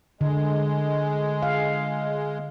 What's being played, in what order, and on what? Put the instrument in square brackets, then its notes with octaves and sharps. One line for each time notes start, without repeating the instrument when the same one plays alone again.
[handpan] D3 [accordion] G#3
[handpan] F5